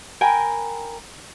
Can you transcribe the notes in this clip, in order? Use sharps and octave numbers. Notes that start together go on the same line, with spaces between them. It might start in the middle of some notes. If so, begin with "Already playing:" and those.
A#4 G5 G#5 B5